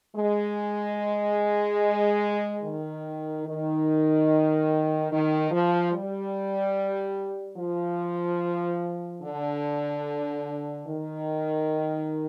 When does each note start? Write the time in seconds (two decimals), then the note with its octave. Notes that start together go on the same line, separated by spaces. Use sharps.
0.17 G#3
2.63 D#3
3.46 D#3
5.11 D#3
5.52 F3
5.92 G3
7.57 F3
9.22 D3
10.87 D#3